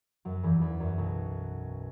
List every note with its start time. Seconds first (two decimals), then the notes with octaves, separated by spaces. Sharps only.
0.25 F#2 F#3
0.43 E2 E3
0.61 E2
0.80 F#2
0.98 B1 B2